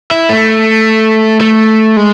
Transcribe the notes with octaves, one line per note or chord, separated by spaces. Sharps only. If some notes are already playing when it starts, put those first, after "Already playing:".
E4
A3
A3
G#3